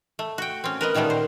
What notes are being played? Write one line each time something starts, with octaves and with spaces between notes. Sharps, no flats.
A3
F#4 G5
C4 C#4
A#4 B4 D#5
A#2 D#3 G3 A3 B3
C5